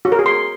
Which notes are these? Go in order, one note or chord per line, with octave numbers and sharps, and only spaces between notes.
F#4
A#4
G#4
C6